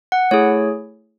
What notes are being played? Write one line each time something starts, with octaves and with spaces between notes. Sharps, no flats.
F#5
A3 E4 G#4 C#5